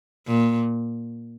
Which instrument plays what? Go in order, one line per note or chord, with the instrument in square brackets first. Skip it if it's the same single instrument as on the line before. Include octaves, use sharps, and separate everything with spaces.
[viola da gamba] A#2